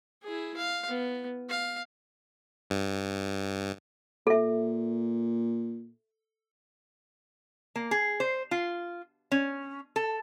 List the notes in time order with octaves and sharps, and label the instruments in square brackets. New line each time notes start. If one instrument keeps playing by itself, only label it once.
[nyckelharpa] E4 G#4
F5
B3
F5
[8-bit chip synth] G2
[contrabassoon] A#2 [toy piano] A4 E5
[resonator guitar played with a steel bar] A#3
G#4
C5
F4
C#4
A4